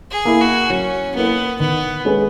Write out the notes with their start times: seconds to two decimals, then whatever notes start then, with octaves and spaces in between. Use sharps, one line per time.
0.11 G#4
0.25 A#3 E4 A#4
0.41 F#4
0.70 F#3 C#4
1.15 A#3 B3 E4 A#4
1.60 D#3 B3
2.05 G#3 C#4 G#4 B4